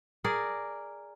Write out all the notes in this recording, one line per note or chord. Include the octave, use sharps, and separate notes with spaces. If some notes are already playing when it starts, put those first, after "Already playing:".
G#4 A#4 D5